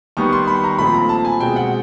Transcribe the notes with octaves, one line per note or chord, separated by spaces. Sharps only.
D#3 G3 B3 C#6
C6
B5
A#5
A#2 F3 A3 C4 B5
A#5
A5
G#5
B2 G#3 C4 G5
F#5